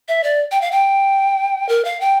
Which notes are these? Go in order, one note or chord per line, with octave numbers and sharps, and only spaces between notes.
E5
D5
G5
F5
G5
A#4
F5
G5